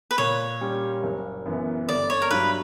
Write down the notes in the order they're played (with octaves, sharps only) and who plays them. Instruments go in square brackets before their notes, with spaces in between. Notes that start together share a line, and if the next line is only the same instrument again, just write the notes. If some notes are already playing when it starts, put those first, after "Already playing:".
[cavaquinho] B4
[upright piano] A#2 [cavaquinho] C#5
[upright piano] G3 C#4 G4
F#1
F#2 E3 B3
[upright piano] G1 [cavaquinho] D5
[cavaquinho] C#5
A#4
[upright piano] G2 F#3 [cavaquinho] B4